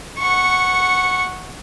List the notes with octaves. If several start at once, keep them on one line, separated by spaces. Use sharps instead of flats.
F#5 C#6